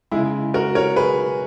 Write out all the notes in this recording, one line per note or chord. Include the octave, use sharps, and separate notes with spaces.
C#3 G#3 E4 G#4
F#4 A#4
A#4 C#5
G#4 B4